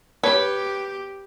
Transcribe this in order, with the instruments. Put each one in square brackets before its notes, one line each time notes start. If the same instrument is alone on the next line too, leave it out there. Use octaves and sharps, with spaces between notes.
[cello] G4 [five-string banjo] B4 [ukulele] C#5